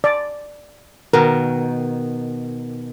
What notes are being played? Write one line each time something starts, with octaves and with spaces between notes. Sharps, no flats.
D5
B2 D#3 A#4